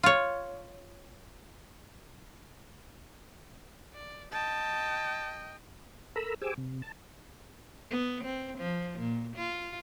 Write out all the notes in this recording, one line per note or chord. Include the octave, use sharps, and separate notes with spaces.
F4 C#5
D5
D#5 G5 A5
A4 A#4 A#5 B5 E6
G4 G#4 C5 G#5 D6 E6
C3
A5
B3
C4
F3
A#2
F4